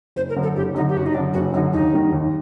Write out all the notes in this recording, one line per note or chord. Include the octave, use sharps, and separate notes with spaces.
F#1 C5
A#4
F#2 D3
A4
F#1 G4
F#2 D3 D#4
G4
F#1 F#4
D#4
F#2 D3 D4
F#1 F#4
F#2 D3 D#4
D#2 D#4
D#3 G3
D#2